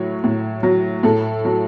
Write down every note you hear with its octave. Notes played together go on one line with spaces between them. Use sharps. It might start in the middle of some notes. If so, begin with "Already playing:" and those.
Already playing: A2 F#3 C#5
A2
F#3
A2 A4
F#3